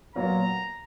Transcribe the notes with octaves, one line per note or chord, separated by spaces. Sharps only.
A#2 F#3 B3 F4 A#5